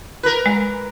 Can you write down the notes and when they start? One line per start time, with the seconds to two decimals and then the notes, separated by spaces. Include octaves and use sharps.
0.23 A#4 B4
0.46 G#3